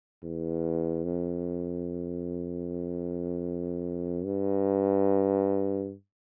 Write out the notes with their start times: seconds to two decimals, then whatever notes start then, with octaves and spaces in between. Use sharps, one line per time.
0.24 E2
1.04 F2
4.25 G2